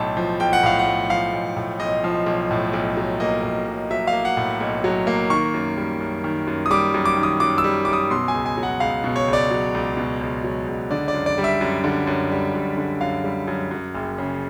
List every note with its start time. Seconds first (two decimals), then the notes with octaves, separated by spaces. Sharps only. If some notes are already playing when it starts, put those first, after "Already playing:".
Already playing: B1 A2 A5
0.17 F3
0.40 B1 G5
0.53 F#5
0.63 A2 F5
0.79 F#5
0.87 B1
1.10 F3 F5
1.33 B1
1.57 A2
1.80 B1 D#5
2.04 F3
2.26 B1
2.51 A2
2.73 B1
2.97 F#3
3.20 A#3 D#5
3.43 A2
3.67 B1
3.90 F#3 E5
4.07 F5
4.13 A#3
4.25 F#5
4.37 A2
4.60 B1
4.84 F#3
5.07 A#3
5.30 D#3 C#6
5.54 F#2
5.77 G3
6.01 F#2
6.24 D#3
6.47 F#2
6.66 D#6
6.70 G3 D6
6.94 F#2
7.05 D6
7.17 D#3
7.23 D#6
7.40 F#2 D6
7.58 E6
7.64 G3
7.85 F#2 D6
7.93 D#6
8.10 B2 C6
8.28 G#5
8.34 C#2
8.46 G#5
8.57 F#3
8.63 F#5
8.80 C#2 F5
9.04 B2
9.16 C#5
9.28 C#2
9.33 D5
9.51 F#3
9.74 C#2
9.97 B2
10.21 C#2
10.44 F#3
10.68 C#2
10.91 D3 D5
11.08 D5
11.14 F#2
11.26 D5
11.38 G3
11.44 E5
11.61 F#2
11.84 D3
12.07 F#2
12.31 G3
12.54 F#2
12.77 D3
13.01 F#2 F5
13.24 G3
13.48 F#2
13.71 F#2
13.95 F#1
14.18 C#3